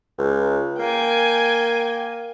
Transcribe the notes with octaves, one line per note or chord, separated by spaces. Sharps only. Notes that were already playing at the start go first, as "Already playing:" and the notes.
C#2
A#3 G5 G#5